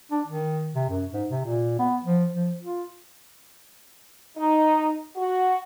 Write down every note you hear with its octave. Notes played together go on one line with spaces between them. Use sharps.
D4
D#3
C3
F#2
G#2
C3
A#2
B3
F3
F3
F4
D#4
F#4